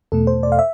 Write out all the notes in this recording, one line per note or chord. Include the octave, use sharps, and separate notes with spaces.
E2 B2 A3 A4
C5
D5
F5
E5